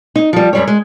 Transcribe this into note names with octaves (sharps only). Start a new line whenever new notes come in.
D#4
F3 G3
F#2 G3 C#5
G#3